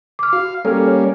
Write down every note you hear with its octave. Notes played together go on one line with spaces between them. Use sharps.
D6 F6
F#4 F5
G3 A#3 C#4 A4 F6
C#5